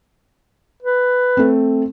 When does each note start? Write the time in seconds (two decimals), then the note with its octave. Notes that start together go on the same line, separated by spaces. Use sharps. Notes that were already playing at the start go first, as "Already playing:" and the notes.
0.83 B4
1.37 A3 C4